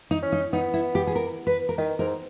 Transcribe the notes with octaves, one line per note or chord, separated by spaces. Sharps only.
D#4
C#4
D#4
B3 D#4
E4
G4
G#4
A#4
B4
A#4
D#3 B4
G#2 A#4